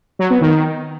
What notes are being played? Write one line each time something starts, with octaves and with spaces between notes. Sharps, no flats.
F#3
B3
D#3